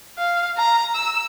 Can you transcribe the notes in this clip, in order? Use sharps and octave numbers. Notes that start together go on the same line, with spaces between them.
F5
A#5
E6